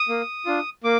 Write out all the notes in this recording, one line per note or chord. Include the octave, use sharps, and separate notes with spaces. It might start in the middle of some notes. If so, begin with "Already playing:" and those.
Already playing: D#6
A#3
D4 F4
A#3 D6